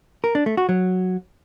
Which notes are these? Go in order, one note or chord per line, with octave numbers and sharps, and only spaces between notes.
A#4
D4
A3
F#4
F#3